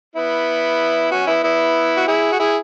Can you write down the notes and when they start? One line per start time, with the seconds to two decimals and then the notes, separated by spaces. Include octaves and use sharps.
0.15 B3 E4
1.11 C#4 F#4
1.27 B3 E4
1.44 B3 E4
1.97 F#4
2.07 E4 G#4
2.32 F#4
2.40 E4 G#4